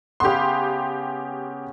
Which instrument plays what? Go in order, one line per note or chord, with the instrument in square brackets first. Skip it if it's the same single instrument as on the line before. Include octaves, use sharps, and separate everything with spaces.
[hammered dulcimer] C#3 B3 [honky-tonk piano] G4 C6